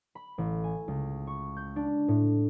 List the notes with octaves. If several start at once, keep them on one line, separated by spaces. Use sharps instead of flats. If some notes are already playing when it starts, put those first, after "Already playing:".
B5
A1
G#5
C#2
C#6
G6
D4
A2